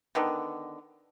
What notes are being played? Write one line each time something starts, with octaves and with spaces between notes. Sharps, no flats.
D3 D#3 B3